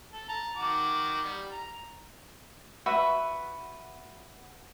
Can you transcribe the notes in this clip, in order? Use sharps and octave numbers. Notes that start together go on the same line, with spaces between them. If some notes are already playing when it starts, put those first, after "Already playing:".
A4
A5 A#5
D#3 F#4 D6
G3
A#5
F#4 B4 E5